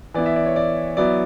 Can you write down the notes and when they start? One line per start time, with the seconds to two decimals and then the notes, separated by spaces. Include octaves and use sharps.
0.14 E3 B3 E4 D5
0.26 E5
0.36 D5
0.46 C#5
0.56 D5
0.97 F#3 B3 E4 D5